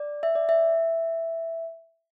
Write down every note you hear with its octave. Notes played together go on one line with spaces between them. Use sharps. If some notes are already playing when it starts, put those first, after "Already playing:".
Already playing: D5
E5
D5
E5